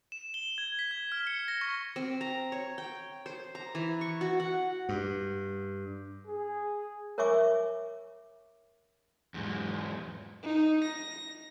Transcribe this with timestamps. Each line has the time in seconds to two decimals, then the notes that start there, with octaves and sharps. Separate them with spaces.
0.12 E7
0.34 G7
0.58 G#6
0.79 B6
0.91 G#6
1.12 F6
1.27 C#7
1.48 A#6
1.61 C#6
1.96 C4
2.21 A#5
2.52 C#5
2.78 G5
3.26 C5
3.55 A#5
3.75 E3
4.01 C#6
4.21 F#4
4.40 F#5
4.89 G2
6.27 G#4
7.18 A#4 C#5 E5 G#5 C#6 D6
9.34 E2 G#2
10.43 D#4
10.83 A#6